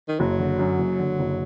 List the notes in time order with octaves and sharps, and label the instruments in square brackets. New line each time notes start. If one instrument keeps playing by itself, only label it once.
[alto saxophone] D#3
[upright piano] F#1 [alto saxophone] F#3
[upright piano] D3
F#2
F#1
D3
F#1